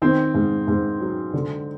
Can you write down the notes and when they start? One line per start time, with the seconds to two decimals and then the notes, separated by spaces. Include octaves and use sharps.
0.02 D#3 C4
0.34 G#2
0.67 G#2
1.01 F#3
1.34 D3